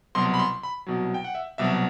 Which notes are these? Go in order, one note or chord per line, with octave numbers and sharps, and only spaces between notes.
C2 B2 F#3 C6
B5
C6
B5
C2 B2 F#3
G5
F#5
E5
C2 B2 F#3 E5